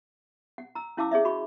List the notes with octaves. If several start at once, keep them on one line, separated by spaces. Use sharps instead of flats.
F#5
A#5 E6
C#4 E4 F5 A5 D6 E6
G#4 C#5 D#5 E5
F#4 B5 C#6